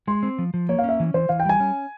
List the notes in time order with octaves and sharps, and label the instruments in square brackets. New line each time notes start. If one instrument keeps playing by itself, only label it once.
[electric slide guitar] G#3 [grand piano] C6
[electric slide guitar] C4
F3
F3
[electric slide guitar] A#3 [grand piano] C#5
[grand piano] F5
[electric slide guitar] C#4
[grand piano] E5
[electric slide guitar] E3
[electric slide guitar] E3 [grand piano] C5
[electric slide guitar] E3 [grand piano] F5
[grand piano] G5
[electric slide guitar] G3 [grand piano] G#5
[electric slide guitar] C#4